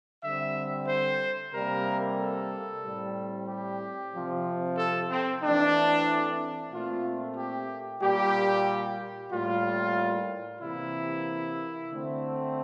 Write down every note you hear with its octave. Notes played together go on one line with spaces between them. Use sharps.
D3 G3 C4 E5
C5
C3 G3 A#3 A#4
A4
A2 G3 C4
G4
C3 F3 C4
A4
C4
E3 A3 C4 D4
A#2 A3 C4 F4
G4
A#2 G3 A#3 G4
A2 G3 A#3 F4
C3 E3 A#3 E4
D3 A3 C4